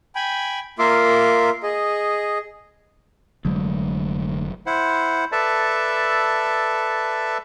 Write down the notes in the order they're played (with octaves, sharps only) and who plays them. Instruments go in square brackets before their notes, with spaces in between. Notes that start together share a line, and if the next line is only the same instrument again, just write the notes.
[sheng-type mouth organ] G5 G#5 B5
A#3 F4 A#4 E5 C6 D6
G#4 D#5
[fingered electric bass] F1 F#3 G#3 [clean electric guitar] D2
[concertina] E4 C5 F#5
A4 B4 D5 E5 A5